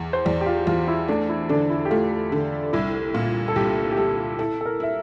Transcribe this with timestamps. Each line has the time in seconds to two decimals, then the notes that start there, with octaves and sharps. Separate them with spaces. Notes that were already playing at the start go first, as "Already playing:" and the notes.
Already playing: E2
0.13 C5
0.25 E2 D5
0.41 G4
0.46 F4
0.67 E2 F4
0.88 E4
1.08 A3 D4
1.29 E4
1.49 D3 D4
1.70 E4
1.85 G4
1.90 A3 F4
2.32 D3
2.73 C2 E4
3.14 A#2 F4
3.48 A4
3.56 C2 G4
3.92 G4
3.97 G3 A4
4.39 E4 A4
4.61 A4
4.65 A#4
4.80 E4 E5